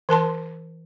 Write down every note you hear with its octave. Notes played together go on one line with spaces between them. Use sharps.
E3 A#4 A5 C6